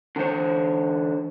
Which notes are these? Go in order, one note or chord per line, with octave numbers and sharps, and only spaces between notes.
D3 E3 C5 C#5